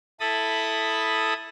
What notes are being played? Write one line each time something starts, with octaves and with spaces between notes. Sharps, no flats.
E4 A4 A5 B5 D#6